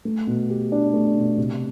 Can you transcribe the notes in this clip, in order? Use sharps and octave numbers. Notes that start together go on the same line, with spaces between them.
A3
B2
G4
D4
A3
B2
C3